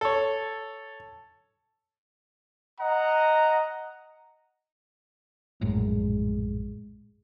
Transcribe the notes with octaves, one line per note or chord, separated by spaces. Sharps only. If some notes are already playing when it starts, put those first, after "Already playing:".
A4 C#5
D#5 F#5 A#5
A#1 F#2 A2 G#3